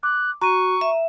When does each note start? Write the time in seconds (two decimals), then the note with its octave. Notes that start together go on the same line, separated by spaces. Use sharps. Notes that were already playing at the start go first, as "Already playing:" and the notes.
0.03 D6 F#6
0.42 F#4 A#5 C#6 D#7
0.81 E5